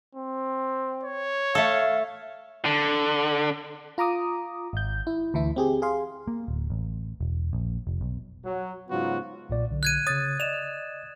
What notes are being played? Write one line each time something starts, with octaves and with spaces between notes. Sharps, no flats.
C4
C#5
A3 A4 F5
D3
F4 A#5 D6 D#6
G#1 G6
E4
D2 E3 E4
C4 G4 G#4
G#4 F5 C6
A#3
D1
A1
E1
A#1
F1
B1
F#3
G#2 C#3 F#3 B3 F4 F#4
B1 A#2 D5
B1 D3
F#6 G#6 D#7
C#3 C#5 D#6 A6
D5 D#5 E7 F7